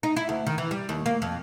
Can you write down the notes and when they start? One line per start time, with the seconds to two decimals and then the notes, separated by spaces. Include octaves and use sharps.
0.03 D#4
0.16 E4
0.29 D2
0.47 D#3
0.58 E3
0.71 G3
0.89 D#2
1.06 A#3
1.22 F2